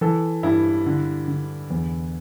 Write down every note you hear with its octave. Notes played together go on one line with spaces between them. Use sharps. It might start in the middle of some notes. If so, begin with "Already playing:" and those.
E3 A4
G2 E4
D3
D3
E2